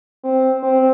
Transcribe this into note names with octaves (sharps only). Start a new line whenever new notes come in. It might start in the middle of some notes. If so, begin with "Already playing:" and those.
C4
C4